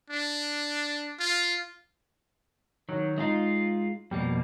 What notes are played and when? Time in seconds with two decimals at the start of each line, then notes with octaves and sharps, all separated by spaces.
0.10 D4
1.19 F4
2.89 D#3 F#3
3.18 G#3 D#4 F4 A#5
4.11 F2 B2 G3 A#3